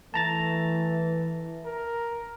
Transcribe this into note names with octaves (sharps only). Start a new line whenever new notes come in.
E3 A3 A5 A#5 A6
A#4